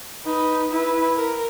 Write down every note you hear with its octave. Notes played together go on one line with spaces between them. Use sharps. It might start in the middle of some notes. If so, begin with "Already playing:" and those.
D#4 B4
E4 B4
A#4